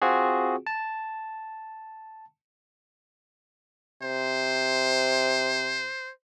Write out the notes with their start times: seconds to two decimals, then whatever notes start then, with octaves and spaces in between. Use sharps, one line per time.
0.02 C4 F4 F#4 G#4
0.67 A5
4.02 C3 C5